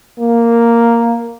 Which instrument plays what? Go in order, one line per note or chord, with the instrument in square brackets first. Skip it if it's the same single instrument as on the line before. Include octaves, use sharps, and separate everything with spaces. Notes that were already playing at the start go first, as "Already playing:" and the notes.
[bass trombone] A#3